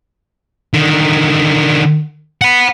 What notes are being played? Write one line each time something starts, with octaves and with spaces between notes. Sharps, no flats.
D3 D#3
F#5 B5